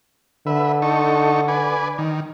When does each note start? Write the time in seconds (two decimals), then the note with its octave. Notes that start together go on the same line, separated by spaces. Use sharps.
0.47 D3 B4 E5
0.82 D#4 A4 C#6
1.48 B4 D5 G#5
1.98 D#3